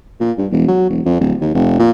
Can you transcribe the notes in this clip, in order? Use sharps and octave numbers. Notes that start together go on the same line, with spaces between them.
A#2
G2
E1
F#3
E1
F2
D1
D#2
F1
A#2